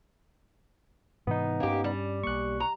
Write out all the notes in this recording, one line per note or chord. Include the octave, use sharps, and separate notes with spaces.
G#2 C3 E3 B3 D#4
G2 A#3 C#4 G4
G3
B1 A#3 C#6 F#6
A#5